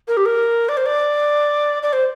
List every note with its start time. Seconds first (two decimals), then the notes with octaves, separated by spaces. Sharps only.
0.08 A#4
0.17 G4
0.26 A#4
0.69 D5
0.77 C5
0.86 D5
1.83 D5
1.93 C5